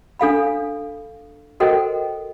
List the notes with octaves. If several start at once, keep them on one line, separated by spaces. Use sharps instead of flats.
D4 A4 F5 B5
F#4 A4 A#4 C5 D#5 G5